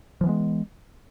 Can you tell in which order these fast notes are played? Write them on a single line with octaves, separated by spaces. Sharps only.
F3 E3 B3 G#3